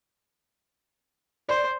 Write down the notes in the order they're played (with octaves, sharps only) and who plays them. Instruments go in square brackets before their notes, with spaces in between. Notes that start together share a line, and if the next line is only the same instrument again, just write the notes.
[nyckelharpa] C5 [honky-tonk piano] D5